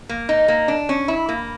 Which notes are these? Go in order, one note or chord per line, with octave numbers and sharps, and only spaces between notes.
A#3
D#4
A#3
D4
C#4
E4
A#3